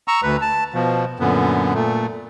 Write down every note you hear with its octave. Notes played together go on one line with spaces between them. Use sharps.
A#5 C#6 E6
D2 B4
A5
B2 F3
F#2 A#2 D3 B3
A#2 A3